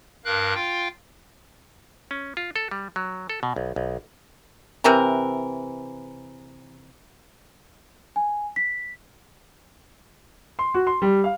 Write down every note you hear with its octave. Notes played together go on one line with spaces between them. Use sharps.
G2 A#4 F5 F#6
F4 F5 G5
C#4
F4
A4
G3
F#3
A4
B2
B1
B1
C3 E3 A#4
G#5
B6
C6
F#4
C6
G3
F5